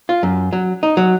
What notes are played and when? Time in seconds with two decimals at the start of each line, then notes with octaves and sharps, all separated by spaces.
0.09 F4
0.23 F#2
0.53 F#3
0.83 D#4
0.97 F#3